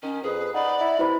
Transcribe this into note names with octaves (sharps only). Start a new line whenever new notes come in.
D#3 C#4
F2 G#4 B4
D#4 D5 F#5 B5
E4
C3 E4 B4 B5